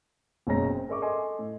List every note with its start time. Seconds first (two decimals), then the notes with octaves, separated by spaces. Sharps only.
0.47 F#1 B2 G#3 C#4 A#5 A#6
0.67 C4
0.89 G#4 A#4 D5 E5 C#6 D6
1.02 A4 D#5 G#5 C6 D6
1.39 A2